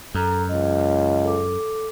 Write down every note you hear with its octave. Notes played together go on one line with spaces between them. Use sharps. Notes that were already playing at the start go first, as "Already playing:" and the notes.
F#2 A4 A#5
C#2 D#5
A4 D6